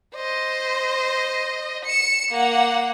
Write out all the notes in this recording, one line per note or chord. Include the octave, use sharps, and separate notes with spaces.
C5 D#5
C#7 E7
A#3 F#5